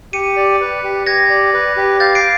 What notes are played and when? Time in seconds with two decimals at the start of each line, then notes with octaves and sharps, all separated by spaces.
0.13 G4 C#7 D#7
0.37 D5
0.61 B4
0.84 G4
1.07 G4 G#6 A#6
1.30 D5
1.54 B4
1.77 G4
2.00 F5 G6 A6
2.15 C7 D7